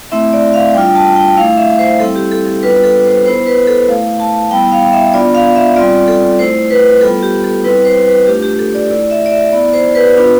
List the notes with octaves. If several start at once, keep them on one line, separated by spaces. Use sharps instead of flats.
A3 C4 E4 E5
D5
F5
G3 D4 F4 G5
A5
G5
A3 E4 F5
E5
C5
G3 C4 E4 A4
G4
A4
A4
G3 B3 D4 F4 B4
A4
C5
B3 E4 C5
B4
A4
A3 E4 F5
A5
G3 B3 E4 G5
F5
E5
B3 D4 F4 D5
F5
E5
G3 C4 F4 D5
A4
A3 E4 C5
B4
G3 B3 F4 A4
G4
A4
G3 C4 E4 B4
C5
B4
A3 D4 F4 G4
G4
A4
D5
A3 E4 D5
E5
D5
E5
B3 E4 D5
C5
B4
B3 D4 F4